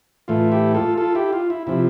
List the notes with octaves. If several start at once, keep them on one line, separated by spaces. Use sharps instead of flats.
A2 E3 A3 F4
E4 G4
F4 A4
F4 A4
E4 G4
F4
E4
C3 F3 E4